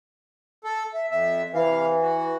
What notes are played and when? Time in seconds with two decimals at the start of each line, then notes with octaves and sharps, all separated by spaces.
0.64 A4
0.94 E5
1.11 F2 E5
1.54 C3 E3 F5
2.02 F#4